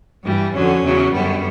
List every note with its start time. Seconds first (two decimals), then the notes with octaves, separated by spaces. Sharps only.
0.23 G2 E3 G3
0.53 F2 D3 F#3 C#4
0.83 E2 C#3 F#3
1.12 F#2 D3 G3 B3